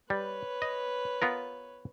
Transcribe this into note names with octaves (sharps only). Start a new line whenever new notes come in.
G3 B4 C#5
D#5
B3 F4 A#4